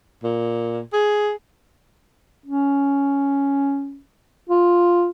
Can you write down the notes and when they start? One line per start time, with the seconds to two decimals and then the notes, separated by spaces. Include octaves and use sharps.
0.24 A#2
0.93 G#4
2.46 C#4
4.49 F4